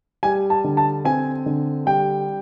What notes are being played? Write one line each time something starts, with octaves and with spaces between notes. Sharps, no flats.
G3 G#5
A5
D3
A5
C4 G#5
D3
G3 G5